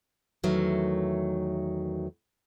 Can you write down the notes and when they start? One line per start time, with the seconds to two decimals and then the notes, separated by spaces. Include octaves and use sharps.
0.44 E2 D#3 F#3 A3